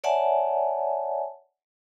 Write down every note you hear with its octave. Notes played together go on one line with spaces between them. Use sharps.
C#5 D5 E5 F#5 G#5 A5